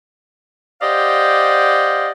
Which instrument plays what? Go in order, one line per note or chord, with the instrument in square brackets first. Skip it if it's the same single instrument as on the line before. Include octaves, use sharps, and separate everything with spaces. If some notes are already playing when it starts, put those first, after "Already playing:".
[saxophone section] G4 C5 D5 D#5 F5 F#5